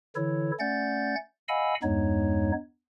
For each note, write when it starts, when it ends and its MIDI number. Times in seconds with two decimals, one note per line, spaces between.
0.16 0.51 50
0.16 0.51 52
0.16 0.51 64
0.16 0.51 69
0.16 0.51 73
0.60 1.15 57
0.60 1.15 61
0.60 1.15 74
0.60 1.15 78
0.60 1.15 91
0.60 1.15 93
1.49 1.75 75
1.49 1.75 77
1.49 1.75 78
1.49 1.75 80
1.49 1.75 83
1.49 1.75 88
1.83 2.52 40
1.83 2.52 43
1.83 2.52 56
1.83 2.52 59
1.83 2.52 63
1.83 2.52 73